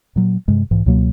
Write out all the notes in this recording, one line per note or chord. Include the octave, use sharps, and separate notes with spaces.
A#2 F#3
G2 C3 G#3
B1 G#2 E3
C#2 B2 F#3 A#3